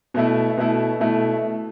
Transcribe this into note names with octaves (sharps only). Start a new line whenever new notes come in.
B2 A3 E4
B2 A3 E4
B2 A3 E4